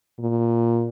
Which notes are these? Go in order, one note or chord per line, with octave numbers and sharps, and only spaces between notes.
A#2